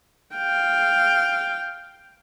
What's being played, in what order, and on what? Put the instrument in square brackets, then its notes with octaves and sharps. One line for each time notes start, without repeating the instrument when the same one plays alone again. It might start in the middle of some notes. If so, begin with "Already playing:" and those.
[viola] F5 G5